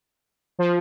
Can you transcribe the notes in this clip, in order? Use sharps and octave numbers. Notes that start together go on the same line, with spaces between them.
F3